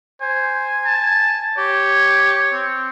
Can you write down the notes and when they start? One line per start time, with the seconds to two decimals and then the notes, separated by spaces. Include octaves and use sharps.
0.22 C5 G#5
0.85 A5
1.58 G4 C#5
2.53 C4